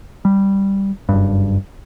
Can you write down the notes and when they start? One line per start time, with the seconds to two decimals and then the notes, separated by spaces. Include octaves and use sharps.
0.25 G3
1.09 F#1 G2